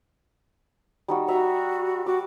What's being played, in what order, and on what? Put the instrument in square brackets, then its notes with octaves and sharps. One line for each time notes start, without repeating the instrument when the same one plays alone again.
[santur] G3 D#4 F#4
[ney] F#4 [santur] E5 A#5
[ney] F#4 [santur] D6